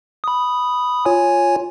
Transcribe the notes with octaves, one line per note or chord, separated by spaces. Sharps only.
B5 D#6
F4 C#5 G#5